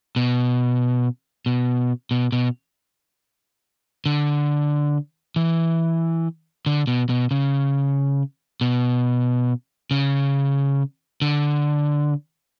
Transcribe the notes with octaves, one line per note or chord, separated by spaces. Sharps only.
B2
B2
B2
B2
D3
E3
D3
B2
B2
C#3
B2
C#3
D3